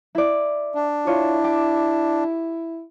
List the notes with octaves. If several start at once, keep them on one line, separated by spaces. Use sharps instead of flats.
E4 D5
D4
E4 F4 C#5
G4